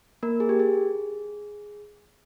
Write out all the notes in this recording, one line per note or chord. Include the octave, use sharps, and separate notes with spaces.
A#3 A#4
G#4
G4
G#4